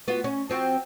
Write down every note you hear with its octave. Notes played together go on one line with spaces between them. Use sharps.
B3 F4 F#4
C#4
F3 C4 F#4